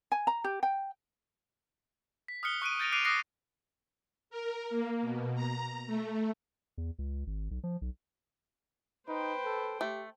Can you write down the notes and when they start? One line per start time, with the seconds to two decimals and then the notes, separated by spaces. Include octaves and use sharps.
0.12 G#5
0.27 A#5
0.44 G4
0.63 G5
2.28 B6
2.43 D#6 F6 F#6 C#7 G7
2.62 C#6 F#6 D7 D#7
2.79 G6 A6 A#6 D7 F7
2.92 D6 F#6 C7 D7 D#7 F7
3.04 D6 D#6 F#6 A#6 C7 C#7
4.30 A#4
4.70 A#3
5.02 B2
5.35 A#5
5.87 A3
6.78 E2
6.99 C#2
7.27 G#1
7.51 B1
7.64 F3
7.82 B1
9.08 D#4 B4 C5 G5
9.45 A4
9.81 A3 G4